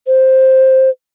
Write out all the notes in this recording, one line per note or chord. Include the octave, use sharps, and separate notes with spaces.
C5